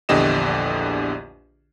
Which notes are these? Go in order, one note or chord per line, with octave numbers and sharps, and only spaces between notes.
A#1 E2 D3 G4 D#5 E7